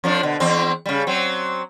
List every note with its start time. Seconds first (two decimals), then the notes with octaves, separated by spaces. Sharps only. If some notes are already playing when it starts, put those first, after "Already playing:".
0.04 F2 F3 D4
0.23 B2 D3
0.40 E2 C4
0.86 C#3 G3
1.07 F#3 C4